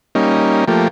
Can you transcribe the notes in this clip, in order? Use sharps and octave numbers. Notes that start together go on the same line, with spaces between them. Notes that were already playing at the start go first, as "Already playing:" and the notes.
G3 A#3 C#4 D#4
F3 A3 A#3 G4